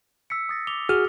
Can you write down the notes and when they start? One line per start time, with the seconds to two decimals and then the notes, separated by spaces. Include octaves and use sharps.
0.30 E6 B6 C#7
0.49 D#6 A6 A#6
0.67 D6 F7 G7
0.89 F#4 G#4 F6